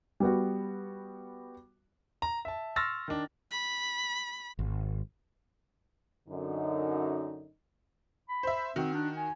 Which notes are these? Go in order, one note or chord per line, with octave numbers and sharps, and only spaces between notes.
G3 B3 F#4
A#5
E5 A5
C6 C#6 E6 F6 A6 A#6
D#3 D4
B5
G#1
F#2 D3 D#4
B5
C5 E5
D#3 C4 F#4
D4
G#5